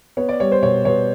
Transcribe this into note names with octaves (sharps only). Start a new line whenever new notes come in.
B3 C#5
D5
G3 C#5
C5
B2 C#5
B2 C#5